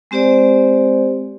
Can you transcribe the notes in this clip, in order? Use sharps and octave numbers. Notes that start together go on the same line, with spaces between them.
G#3 C4 G4 C5 D5